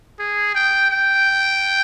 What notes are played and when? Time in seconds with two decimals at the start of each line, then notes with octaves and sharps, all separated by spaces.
0.19 G#4
0.55 G5
0.91 G5